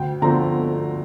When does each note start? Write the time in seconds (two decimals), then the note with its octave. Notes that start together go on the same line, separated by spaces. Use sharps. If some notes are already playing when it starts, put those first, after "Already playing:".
Already playing: D2 G5
0.22 D3 F3 A3 C4 A#5